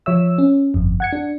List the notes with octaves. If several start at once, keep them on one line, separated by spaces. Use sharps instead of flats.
F3 C#5 E5 E6
C#4
G1 F2
F#5 G#6 C#7
D4